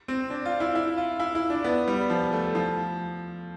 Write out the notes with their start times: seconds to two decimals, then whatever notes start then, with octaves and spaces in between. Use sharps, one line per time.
0.08 C4
0.30 D4
0.45 F4
0.60 E4
0.75 E4
0.98 F4
1.20 E4
1.35 E4
1.50 D4
1.64 B3
1.88 G3
2.10 F3
2.33 A3
2.55 F3